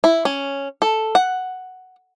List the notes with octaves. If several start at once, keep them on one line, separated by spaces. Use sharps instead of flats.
E4
C#4
A4
F#5